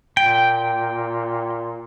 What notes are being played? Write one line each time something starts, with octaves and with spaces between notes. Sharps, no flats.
A#2 G5